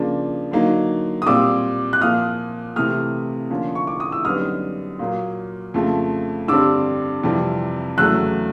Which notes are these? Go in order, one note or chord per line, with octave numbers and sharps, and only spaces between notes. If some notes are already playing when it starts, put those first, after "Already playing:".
Already playing: C#3 F3 A#3 D4
D3 F#3 A#3 D#4
D#6
A#2 G3 C4 D6 E6
F#6
A#2 F3 A#3 D#6 F6
C3 E3 A3 D#6 F6
D3 F3 A#3 C#4
C#6
D6
D#6
E6
F#2 D3 G3 B3 D#4 D#6 F6
A#2 F#3 A#3
F2 C#3 F3 A3
G2 D3 G3 C4 D6 E6
F2 C3 E3 G3
E2 C#3 F#3 A3 E6 F#6